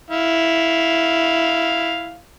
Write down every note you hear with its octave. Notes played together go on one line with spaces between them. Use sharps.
E4 F5